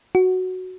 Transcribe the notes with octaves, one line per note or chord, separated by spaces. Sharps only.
F#4